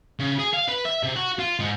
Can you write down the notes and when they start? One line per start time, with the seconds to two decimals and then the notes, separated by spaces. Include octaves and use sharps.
0.20 C#3
0.39 G#4
0.54 F5
0.69 B4
0.85 E5
1.03 C3
1.16 F#4
1.39 F4
1.60 G#2